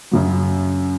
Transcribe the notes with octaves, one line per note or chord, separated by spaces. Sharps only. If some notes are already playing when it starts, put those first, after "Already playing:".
F#2 C#3 F#3